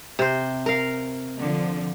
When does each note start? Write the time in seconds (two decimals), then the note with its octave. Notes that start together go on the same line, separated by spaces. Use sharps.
0.19 C3 C5
0.66 A#4 F5
1.38 D3 F3